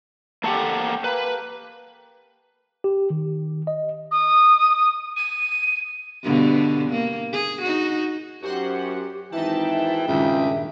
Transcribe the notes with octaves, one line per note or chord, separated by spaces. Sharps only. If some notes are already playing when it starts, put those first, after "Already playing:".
A3 A#3 G4 A4 F#5
A#3 B4
G4
D#3
D#5
D#6
D#7
G2 B2 D3
A#3
G#4
D#4 F#4
F#2 F#4 G4 C5 F#5
G#1 E3 D#4 E5 G5 A5
C#2 G2 A#2 D#3 E5